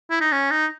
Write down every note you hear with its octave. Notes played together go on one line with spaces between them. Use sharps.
E4
D#4
C#4
D#4